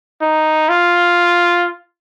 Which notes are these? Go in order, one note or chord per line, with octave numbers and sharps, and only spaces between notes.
D#4
F4